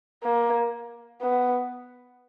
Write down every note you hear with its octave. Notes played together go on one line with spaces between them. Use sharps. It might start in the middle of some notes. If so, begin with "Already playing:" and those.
A#3
B3